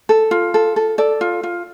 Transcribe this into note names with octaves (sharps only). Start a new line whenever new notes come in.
A4
F4
A4
A4
A4 D5
F4
F4